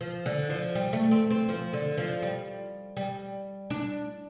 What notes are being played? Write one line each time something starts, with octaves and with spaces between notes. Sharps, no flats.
F3
D3
F3
G3
A3
C4
C4
F3
D3
F3
G3
G3
D4